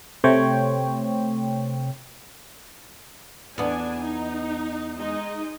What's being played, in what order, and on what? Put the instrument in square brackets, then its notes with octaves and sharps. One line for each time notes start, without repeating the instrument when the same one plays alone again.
[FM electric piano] C3 A3 C5 C#5 G5
[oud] E2 B3 [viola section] D4 G#5
[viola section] D#4
G#3 D#4 D#5